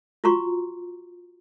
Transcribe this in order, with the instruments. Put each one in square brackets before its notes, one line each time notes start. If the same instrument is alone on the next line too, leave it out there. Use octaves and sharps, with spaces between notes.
[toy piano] F4 F#4 A#5 C6 C#6